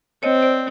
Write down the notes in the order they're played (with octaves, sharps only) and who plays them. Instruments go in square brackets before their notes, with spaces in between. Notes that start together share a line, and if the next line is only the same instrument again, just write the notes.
[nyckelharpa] C4 [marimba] C#5 D#5
[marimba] C5 D5